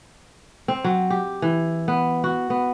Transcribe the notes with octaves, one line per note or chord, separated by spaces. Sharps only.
C4
F#3
G4
E3
B3
F#4
B3